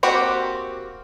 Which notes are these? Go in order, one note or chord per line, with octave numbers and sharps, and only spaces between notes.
A#3 C4 F#4 G4